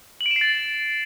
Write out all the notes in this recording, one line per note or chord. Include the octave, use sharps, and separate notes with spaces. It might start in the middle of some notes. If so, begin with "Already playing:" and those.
F#7
D7
E7
C7
A6